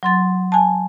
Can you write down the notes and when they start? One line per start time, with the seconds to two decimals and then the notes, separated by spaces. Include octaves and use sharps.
0.03 F#3 C6 A6
0.52 G#5 A5